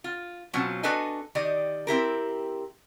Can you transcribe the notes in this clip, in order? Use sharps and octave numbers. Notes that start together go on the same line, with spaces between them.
F4
B2 F#3 C4 C#4 F4
D4 F#4 A4 B4 D#5 G#5
D#3 G4 D5 D#5
C4 E4 G4 A#4